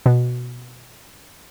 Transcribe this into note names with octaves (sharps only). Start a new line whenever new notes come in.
B2